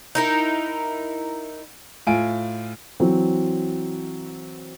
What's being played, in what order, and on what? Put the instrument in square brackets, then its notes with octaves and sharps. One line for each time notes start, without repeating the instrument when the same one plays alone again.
[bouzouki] D#4 E4 A#4
[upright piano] A2 F4 G#5 D7
[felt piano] E3 F#3 C4